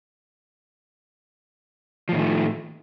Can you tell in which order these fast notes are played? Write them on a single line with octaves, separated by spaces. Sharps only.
F3 A2 D#3 A3